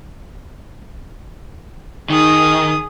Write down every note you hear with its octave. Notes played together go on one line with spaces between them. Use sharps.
D#3 G#4 D#6